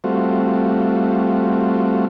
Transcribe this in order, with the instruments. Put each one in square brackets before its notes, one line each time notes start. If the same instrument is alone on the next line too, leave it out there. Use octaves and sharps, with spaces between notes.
[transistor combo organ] G3 A3 C4 F4 F#4